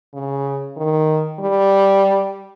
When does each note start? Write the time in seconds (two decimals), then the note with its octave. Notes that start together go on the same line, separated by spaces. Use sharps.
0.14 C#3
0.77 D#3
1.39 G3